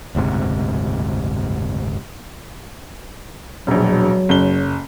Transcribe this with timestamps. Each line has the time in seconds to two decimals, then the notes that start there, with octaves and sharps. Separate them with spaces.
0.15 F#1 D2 G#2 C3
3.67 E1 A#1 F#3
4.29 F#1 G7